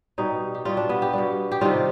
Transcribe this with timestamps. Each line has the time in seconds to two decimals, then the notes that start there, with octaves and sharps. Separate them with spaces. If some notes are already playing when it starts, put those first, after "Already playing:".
0.18 B2 G3 D#4
0.54 G4
0.65 B2 G3 F4
0.77 D4
0.89 B3
1.02 G4
1.13 B2 G3
1.51 G4
1.61 C3 D#3 G3 F4